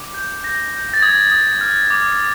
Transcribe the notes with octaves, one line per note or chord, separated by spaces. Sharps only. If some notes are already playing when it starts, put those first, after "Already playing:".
Already playing: D6
G6
G6 A#6
G6
A6
D#6 G#6
D#6
F6
D6